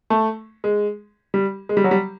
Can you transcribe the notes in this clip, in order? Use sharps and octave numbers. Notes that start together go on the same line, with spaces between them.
A3
G#3
G3
G#3
G3
F#3
G3